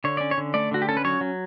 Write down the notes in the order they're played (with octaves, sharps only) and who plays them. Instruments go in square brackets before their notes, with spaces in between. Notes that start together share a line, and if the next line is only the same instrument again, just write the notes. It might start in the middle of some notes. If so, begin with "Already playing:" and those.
[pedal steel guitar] D3 C#5
C#4 D5
C#5
D3
A3 D5
D3 F#4
G4
C#4 A4
B4
F#3 C#5
F#3